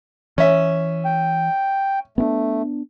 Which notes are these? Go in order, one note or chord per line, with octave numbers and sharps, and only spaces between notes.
E3 C#4 E5
G5
A3 B3 C4 D4